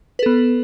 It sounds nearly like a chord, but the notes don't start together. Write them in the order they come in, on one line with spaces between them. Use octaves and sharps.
B4 A4 B3